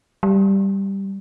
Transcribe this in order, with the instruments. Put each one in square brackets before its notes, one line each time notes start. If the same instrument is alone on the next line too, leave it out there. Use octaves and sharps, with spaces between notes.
[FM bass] G3